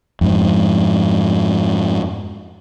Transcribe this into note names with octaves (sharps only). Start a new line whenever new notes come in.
F2 G#2